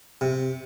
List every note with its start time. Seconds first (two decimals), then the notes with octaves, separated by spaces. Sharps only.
0.21 C3